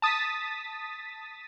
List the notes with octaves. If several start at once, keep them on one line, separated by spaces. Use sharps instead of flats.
A5 D#6 A6 B6